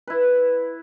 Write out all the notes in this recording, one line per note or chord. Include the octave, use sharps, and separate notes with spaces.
E4 B4